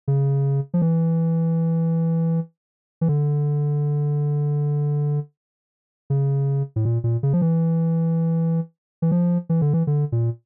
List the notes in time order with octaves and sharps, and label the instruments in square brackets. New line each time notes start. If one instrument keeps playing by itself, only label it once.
[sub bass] C#3
F3
E3
E3
D3
C#3
A2
A#2
A#2
C#3
F3
E3
E3
F3
E3
D3
E3
D3
A#2